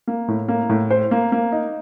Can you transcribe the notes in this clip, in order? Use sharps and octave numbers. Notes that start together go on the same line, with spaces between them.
A#3
A2
A#3
A2
C5
A#3
A#3
D#4